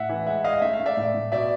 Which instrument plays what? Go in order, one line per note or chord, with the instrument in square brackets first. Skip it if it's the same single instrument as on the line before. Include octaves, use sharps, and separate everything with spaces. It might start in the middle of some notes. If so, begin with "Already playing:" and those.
Already playing: [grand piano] A2 E5 F#5
E3
G#3 E5 F#5
G#3 D#5 F5
A3 E5
F5
A3
D5 E5
A2
A2
B2 D5 E5